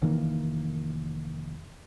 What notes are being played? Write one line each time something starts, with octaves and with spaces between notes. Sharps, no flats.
F1 D#3 E3 A#3